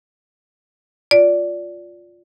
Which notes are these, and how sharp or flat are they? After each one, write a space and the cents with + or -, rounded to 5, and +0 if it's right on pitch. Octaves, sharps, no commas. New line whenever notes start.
F4 +10 D5 -15